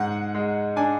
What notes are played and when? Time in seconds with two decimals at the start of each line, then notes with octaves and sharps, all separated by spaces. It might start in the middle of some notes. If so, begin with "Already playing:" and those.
Already playing: G#2 G#3 F#5
0.35 G#3
0.76 D4 G#5